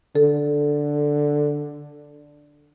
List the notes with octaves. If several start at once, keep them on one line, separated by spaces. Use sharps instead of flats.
D3 A4